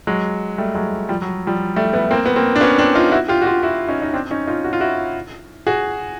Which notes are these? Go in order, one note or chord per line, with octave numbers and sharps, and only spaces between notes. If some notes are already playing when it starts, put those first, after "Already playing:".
F#3 G#3
G3 A3
F#3 G#3
F3 G3
F#3
F3 G3
G3 A3
A3 B3
A#3 C4
B3
A#3 C4
D4
B3 C#4
C4 D4
D#4 F4
E4 F#4
F4 G4
F#4
F4 G4
E4 F#4
C#4 D#4
D#4
C4 D4
C#4 D#4
D#4 F4
F#4
F4
E4 F#4
F#4 G#4